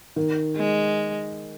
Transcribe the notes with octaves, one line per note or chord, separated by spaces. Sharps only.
D#3
G#3